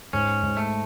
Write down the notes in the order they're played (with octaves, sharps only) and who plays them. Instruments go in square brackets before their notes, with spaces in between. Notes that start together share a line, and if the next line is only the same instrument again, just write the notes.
[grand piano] G#2 [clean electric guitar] C#4
[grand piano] G#2
[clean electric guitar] A3